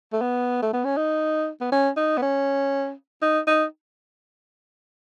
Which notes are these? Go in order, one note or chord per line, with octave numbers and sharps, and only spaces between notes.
A3
B3
A3
B3
C#4
D#4
B3
C#4
D#4
B3
C#4
D#4
D#4